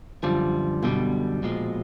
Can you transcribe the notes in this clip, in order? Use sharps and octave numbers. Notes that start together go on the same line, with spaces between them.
F#2 D3 F3 G3
F#2 B2 D3 G3
A#2 F3 G#3